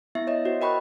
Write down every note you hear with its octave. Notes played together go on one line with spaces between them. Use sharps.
B3 E4 E5
C#5 D#5 E5
F#4 C5
A#4 D#5 G5 B5 C#6 F#6